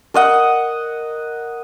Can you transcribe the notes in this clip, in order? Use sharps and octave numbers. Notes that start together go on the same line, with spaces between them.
A#4 D#5 F#5